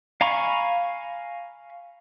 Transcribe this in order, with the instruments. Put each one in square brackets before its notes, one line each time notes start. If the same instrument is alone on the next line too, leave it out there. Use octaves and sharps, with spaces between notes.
[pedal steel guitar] F5 G#5 A#5 B5 C#6